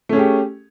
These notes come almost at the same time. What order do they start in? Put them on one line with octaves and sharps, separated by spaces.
A3 C#4 G#4 G4